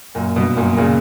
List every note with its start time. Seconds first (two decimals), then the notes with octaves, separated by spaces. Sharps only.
0.15 F#2 A#2
0.36 G2 B2
0.56 F#2 A#2
0.77 A#2 C#3